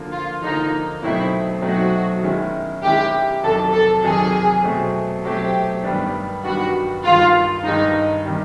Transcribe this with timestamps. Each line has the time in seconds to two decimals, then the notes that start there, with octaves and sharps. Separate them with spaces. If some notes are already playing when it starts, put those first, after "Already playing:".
Already playing: D3 F3 A#3
0.12 F4
0.42 D3 F3 A#3 D#4
1.02 B2 F#3 A3 C4 D#4 E4
1.62 B2 F#3 A3 C4 D#4 F#4
2.23 D#3 G#3 C#4 E4
2.83 D#3 G#3 C#4 E4 G4
3.43 F2 C3 D#3 F#3 A4
3.74 A4
4.04 F2 C3 D#3 F#3 G#4
4.63 B2 F#3 A3 C4
5.24 B2 F#3 A3 C4 G4
5.84 G2 D#3 G3 B3 D4
6.44 G2 D#3 G3 B3 D4 F#4
7.04 G2 D#3 G#3 F4
7.64 G2 D#3 G#3 D#4
8.25 C3 D#3 G3